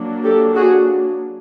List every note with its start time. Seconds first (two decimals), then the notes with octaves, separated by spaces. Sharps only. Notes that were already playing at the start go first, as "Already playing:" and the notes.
Already playing: F#3 A#3 D4
0.24 G4 A4
0.55 F#4 G#4